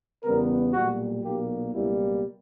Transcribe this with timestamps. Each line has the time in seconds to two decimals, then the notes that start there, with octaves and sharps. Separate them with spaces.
0.24 E2 C#3 G3 B3 A#4
0.73 B1 A#2 G3 F#4
1.23 B1 A#2 A#3 G4
1.72 C#2 B2 G3 A#3 E4